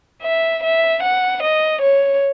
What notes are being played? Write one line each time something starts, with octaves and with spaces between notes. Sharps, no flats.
E5
E5
F#5
D#5
C#5